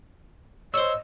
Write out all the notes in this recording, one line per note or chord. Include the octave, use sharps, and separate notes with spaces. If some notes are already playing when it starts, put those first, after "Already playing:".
C5 C#5 D#5 E6